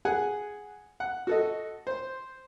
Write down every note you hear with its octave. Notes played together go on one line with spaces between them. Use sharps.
G#4 F#5 G#5
F#5
F#4 A4 D#5
C5